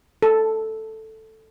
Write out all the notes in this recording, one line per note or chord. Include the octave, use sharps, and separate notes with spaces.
A4